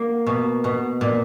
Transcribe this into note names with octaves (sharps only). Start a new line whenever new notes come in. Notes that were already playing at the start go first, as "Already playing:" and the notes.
Already playing: A#3
B2
B2
A#2